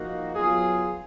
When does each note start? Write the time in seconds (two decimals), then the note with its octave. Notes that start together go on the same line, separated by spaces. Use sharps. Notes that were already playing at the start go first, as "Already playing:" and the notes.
Already playing: F3 A#3 D#4 F#4
0.35 F#3 B3 F4 G#4